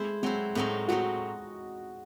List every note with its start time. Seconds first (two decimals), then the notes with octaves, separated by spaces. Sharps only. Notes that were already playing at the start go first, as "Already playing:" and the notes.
Already playing: G#3 A3 E4 C5
0.23 F#3 G#3 C4 E4 C5
0.55 A2 F#3 G#3 C4 D#4
0.88 A2 F#3 C4 D#4 F#4